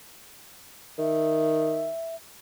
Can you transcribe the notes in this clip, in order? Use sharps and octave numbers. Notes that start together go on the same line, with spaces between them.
D#3 E5